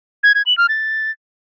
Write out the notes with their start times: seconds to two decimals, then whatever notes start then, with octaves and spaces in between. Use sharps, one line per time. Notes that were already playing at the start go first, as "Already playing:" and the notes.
0.23 G#6
0.35 G#6
0.46 F#7
0.57 F6
0.69 A6